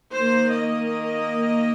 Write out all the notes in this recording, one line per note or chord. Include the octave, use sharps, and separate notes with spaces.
D#3 A#3 C5
D#5